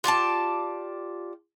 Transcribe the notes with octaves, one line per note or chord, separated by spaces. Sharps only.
F4 G4 D5 A5